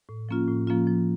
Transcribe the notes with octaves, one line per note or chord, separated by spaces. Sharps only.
A2
F3 A#3 C#4 F4
A2
F3 A#3 C#4 F4
F3